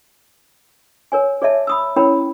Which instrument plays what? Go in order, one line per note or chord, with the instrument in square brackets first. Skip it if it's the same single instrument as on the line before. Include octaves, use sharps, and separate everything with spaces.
[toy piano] A#4 C#5 G#5
G#4 C#5 D5 E5 A5
B5 D#6 E6
C#4 E4 A#4 C#5 G5 B5